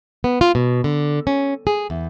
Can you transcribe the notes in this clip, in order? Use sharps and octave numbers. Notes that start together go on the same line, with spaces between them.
B3
F4
B2
D3
C#4
G#4
E2